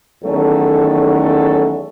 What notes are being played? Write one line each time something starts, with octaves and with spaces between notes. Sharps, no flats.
E2 D#3 F#3 A3 C#4 A4
A4